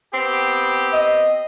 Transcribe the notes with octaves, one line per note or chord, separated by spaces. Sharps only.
B3 C4 G4
D#5